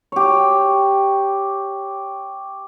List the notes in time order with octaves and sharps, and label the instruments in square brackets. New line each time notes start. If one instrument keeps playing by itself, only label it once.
[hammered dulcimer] G4 C#5